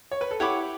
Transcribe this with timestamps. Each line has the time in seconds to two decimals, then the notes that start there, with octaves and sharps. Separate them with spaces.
0.11 C#5
0.21 B4
0.31 A4
0.40 E4 G4 C#5 F#5 B5 D6